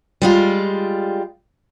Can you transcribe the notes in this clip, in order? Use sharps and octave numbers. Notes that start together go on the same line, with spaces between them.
G3 G#3 F4